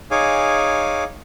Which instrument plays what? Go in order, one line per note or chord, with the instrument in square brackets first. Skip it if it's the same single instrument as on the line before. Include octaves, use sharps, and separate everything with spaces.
[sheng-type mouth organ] D#4 G#4 C#5 F5 G#5 D6